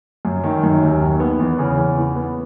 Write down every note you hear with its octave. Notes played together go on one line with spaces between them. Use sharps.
F#2
D#3
F#2
D#2
D#3
B3
E2
C#3
E2
E3
B3